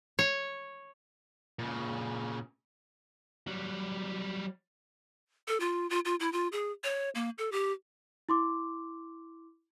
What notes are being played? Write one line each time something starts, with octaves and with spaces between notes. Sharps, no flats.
C#5
A#2 C#3
F#3 G3
A4
F4
F4
F4
E4
F4
G#4
C#5
A#3
A4
G4
E4 C6 D6